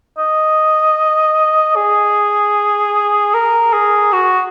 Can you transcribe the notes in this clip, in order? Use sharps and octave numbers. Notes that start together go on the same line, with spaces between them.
D#5
G#4
A#4
G#4
F#4